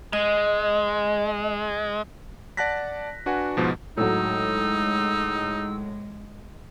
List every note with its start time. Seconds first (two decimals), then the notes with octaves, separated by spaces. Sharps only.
0.13 G#3 D#5
2.57 D5 F#5 A5 F#6 A#6 B6
3.26 D4 F#4 B4 F#5 G#5
3.57 G#2 B2 F3
3.97 A2 F#3 G#3 D#4 E6